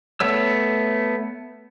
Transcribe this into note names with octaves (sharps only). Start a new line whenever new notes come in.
A3 B3 C#5 E6